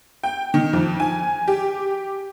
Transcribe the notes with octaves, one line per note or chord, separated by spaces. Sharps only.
G5
D#3
F2
G#5
G4